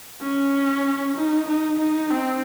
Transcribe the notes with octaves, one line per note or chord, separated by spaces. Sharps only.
C#4
D#4
D#4
D#4
C4